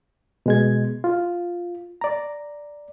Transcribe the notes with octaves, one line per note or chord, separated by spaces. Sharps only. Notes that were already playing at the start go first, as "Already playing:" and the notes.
B2 G#3 G#6
F4
D5 A#5